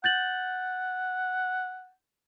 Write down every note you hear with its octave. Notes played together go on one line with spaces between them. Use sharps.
F#5 G6 A6 F#7